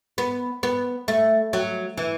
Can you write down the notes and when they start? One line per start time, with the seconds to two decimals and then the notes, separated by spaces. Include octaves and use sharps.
0.18 B3
0.63 B3
1.08 A3
1.53 F#3
1.98 E3